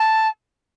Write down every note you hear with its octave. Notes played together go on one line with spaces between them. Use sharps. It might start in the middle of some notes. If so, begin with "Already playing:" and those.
Already playing: A5